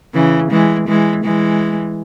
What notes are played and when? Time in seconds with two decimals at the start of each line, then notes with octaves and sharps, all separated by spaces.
0.14 C#3 E3
0.51 E3 G#3
0.88 E3 G#3
1.24 E3 G#3